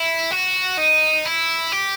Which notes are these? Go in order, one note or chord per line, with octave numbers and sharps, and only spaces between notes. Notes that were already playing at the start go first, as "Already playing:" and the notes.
Already playing: E4
F#4
D#4
E4
G4